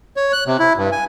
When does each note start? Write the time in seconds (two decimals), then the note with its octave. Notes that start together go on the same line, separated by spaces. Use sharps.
0.17 C#5
0.33 F#6
0.46 C3
0.59 E4
0.77 G2
0.92 G#5